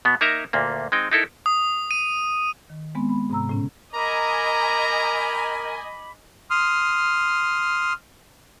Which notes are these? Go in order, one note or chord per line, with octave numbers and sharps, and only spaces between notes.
B2 B3
A#3 D#4 A#4 E5 A#5
D2 A#2 A#3
G#3 C4 D#4 G5
D#4 E4 A4 A#4
D#6
D#7
D#3
G#3 B3 C4
B5
G#2 C3 A#5 E6
A2 C#3 C#4
A#4 D#5 G#5 A#5 B5 D6
C6 D#6 F6